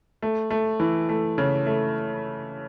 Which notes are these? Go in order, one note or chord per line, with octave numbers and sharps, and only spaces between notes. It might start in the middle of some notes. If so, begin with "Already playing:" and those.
A3
A3
E3
A3
C#3
A3